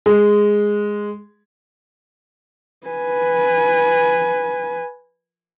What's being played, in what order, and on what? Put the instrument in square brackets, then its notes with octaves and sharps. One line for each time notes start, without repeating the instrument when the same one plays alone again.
[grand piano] G#3
[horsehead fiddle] B4 G#5